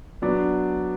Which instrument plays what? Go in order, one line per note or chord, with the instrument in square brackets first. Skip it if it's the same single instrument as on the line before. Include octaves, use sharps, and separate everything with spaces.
[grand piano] F#3 B3 D4